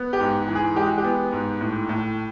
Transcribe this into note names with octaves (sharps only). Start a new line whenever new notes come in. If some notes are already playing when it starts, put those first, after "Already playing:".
Already playing: B3
G4
G#2
E3
G#4
G#3 G4
F#4
G4
B3
G#2
A2
A2